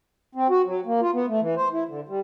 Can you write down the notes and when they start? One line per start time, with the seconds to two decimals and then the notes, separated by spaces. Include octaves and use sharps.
0.35 C4
0.50 F#4
0.66 F#3
0.86 A#3
1.02 F4
1.13 B3
1.28 A3
1.41 E3
1.56 C5
1.73 E4
1.88 D3
2.08 G3